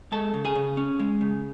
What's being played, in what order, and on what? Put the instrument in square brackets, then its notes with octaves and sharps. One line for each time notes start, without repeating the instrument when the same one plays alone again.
[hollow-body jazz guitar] G#3 A4 A5
C#3
G#4 G#5
C#3
C#4
G#3
C#3